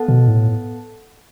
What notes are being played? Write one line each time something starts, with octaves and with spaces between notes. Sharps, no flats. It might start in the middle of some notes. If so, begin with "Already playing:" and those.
Already playing: B3 A4 F#5 A5
B2
A2